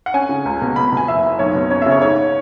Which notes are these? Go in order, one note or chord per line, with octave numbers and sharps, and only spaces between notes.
F#5
C#4 G#5
C#3
C#2
B2
B2 B5
B5
B2 G#5
F#1 E5
F#1
B1 C#5
B2
C#4 C#5
E5
C#3
C#5
G#2 C#5